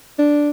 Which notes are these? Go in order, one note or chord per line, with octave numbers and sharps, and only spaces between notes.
D4